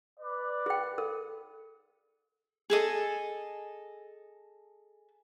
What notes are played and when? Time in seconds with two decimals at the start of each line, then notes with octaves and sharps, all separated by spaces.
0.18 B4 D5
0.66 G#4 G5
0.98 A4
2.70 G#4 A4 D#5